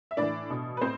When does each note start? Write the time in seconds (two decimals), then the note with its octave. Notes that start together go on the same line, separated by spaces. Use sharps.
0.11 E5
0.17 A2 E3 D4 D5
0.50 B2
0.77 B4
0.81 A2 C4 C5